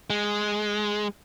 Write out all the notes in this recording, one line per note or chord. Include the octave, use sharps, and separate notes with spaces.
G#3